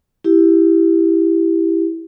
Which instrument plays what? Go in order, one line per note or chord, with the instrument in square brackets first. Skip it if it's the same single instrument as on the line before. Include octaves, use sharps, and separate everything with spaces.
[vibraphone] E4 G4